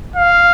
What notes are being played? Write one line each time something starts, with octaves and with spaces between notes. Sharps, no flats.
F5